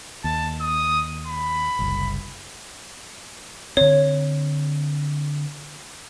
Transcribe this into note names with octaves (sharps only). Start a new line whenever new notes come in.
D#2 A5
D#6
B5
F#1 C2
D3 C4 C#5